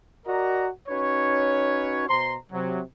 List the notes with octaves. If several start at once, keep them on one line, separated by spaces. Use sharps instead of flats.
F#4 A#4 D5 D#5 A#5
C#4 D#4 F#4 B4 C#5
B2 C5 A#5 C6
C3 F#3